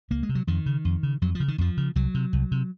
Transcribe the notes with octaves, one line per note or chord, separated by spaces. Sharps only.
C#2 A#3
G#3
C3
F#3
F2 D#3
C#3
F2
C#3
F2 F#3
F3
C#3
D#3
F2 F3
C#3
C2 F#3
C3
C2
C3